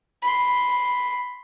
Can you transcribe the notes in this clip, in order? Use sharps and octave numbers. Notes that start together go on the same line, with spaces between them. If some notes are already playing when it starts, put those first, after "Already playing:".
B5 C6